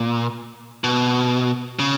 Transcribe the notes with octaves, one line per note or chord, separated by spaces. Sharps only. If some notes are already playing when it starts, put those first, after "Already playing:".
Already playing: A#2
B2
C#3